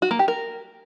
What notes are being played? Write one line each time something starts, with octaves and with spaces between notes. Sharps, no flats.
F#4
A#3
G4
A#4